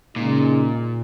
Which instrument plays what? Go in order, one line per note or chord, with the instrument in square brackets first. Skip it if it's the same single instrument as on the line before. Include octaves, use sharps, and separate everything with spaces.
[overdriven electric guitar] A#2 [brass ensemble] C#3 G#3 D#4